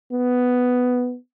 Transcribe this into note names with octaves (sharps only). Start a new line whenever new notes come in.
B3